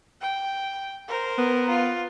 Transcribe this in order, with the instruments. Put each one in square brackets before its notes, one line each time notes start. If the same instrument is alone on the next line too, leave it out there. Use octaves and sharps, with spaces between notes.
[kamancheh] G5
A#4 C5
[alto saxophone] B3
[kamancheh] F4